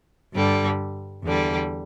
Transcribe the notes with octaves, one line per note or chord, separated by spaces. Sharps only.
G2 D3 G3
E2 D3 G3